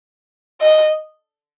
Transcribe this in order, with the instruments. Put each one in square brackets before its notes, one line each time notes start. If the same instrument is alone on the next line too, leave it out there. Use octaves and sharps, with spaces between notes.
[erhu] D#5